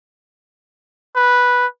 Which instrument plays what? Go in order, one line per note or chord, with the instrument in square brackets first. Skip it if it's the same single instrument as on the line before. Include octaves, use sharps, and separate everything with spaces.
[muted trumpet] B4